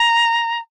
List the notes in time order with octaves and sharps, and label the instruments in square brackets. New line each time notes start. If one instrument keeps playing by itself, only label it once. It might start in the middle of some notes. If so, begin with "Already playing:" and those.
Already playing: [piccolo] A#5